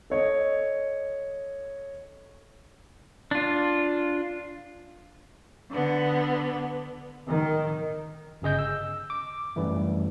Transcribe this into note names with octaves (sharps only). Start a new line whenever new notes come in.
A4 C#5 D#5
D4 F4
D3 B3
D#3
G1 C#3 G#4 D#5 G6
E6
D6
F#2 E3 G3 A3